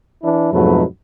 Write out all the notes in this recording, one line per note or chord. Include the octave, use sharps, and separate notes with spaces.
E3 D4 E4
F2 G#2 B2 F#3 A3 B4